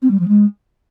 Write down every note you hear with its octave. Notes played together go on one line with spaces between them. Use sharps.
C4
G3
F3
G#3